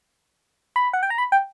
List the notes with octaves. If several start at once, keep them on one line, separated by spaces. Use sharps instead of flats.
B5
F#5
G5
A#5
B5
G5